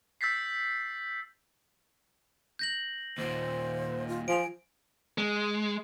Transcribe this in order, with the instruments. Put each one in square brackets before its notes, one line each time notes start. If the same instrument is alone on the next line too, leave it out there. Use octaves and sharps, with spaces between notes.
[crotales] E6 G6 A6 B6 C7
[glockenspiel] G6 A#6 F#7
[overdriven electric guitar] D#2 A#2 [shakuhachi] C5
[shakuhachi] F4
[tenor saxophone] F3 [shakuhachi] G#5 [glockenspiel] D7 F7
[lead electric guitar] G#3